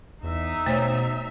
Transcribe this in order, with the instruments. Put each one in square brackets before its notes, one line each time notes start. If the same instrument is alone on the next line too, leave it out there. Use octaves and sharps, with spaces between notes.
[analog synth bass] E2 [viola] D#4 E5
[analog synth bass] B2 [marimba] A3 C5 C#5